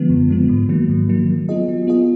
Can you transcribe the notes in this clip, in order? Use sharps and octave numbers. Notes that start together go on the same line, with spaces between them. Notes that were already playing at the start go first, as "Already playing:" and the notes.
Already playing: D3 F3 G#3 B3
F#2
D3 F3 G#3 B3
G#2
D#3 F#3 A#3
G#2
D#3 F#3 A#3
F#3
B3 F4 G#4 D#5
F#3
B3 F4 G#4 D#5